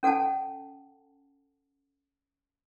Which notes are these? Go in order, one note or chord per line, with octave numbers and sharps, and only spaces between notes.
C#4 A4 F#5 G#5 A5